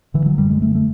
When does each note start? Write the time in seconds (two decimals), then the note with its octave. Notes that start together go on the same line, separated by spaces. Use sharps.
0.14 D3 E3
0.26 F#3
0.38 F#2 G3
0.50 G#3
0.61 D3 A3
0.75 A3